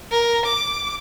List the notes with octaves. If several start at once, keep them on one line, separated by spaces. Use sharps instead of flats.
A#4
D6